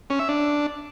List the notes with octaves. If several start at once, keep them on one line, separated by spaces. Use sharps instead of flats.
C#4
E5
D4